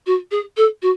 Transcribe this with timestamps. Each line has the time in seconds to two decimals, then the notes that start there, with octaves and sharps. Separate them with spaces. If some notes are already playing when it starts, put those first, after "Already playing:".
0.06 F#4
0.31 G#4
0.57 A4
0.82 F#4